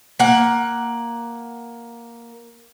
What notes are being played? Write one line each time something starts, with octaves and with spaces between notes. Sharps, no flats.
A#3 F#5